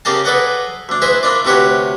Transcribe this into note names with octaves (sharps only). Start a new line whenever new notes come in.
C#3 A#3 G4 D#5 F5 A5
G#4 A4 B4 D5 D#5 F#5
D2 D4
E4 G#4 B4 C5 D#5
A#3 D4 E4 F4 D5
D2 C3 F#4 G4 B4 C#5